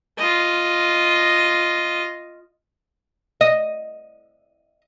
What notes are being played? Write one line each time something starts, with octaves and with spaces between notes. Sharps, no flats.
F4 D#5
D#5